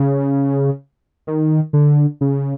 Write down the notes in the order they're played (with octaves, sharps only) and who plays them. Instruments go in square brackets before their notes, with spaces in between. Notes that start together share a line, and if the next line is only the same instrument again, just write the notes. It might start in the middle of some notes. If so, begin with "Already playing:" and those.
Already playing: [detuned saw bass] C#3
D#3
D3
C#3